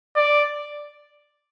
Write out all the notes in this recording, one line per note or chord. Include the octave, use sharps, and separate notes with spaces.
D5